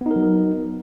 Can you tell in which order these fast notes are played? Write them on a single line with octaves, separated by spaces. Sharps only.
B3 D#4 A#4 F#3